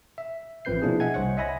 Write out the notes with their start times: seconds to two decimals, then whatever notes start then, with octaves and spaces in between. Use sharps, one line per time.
0.18 E5
0.65 A1 F3 C4 B4 G6 C7
0.82 B2 F3 A#3 D4 E4 G#4
1.00 D#5 E5 F#5 G#5 G#6
1.14 C2 C5 C#5 F#5
1.37 D#5 E5 G#5 B5 A#6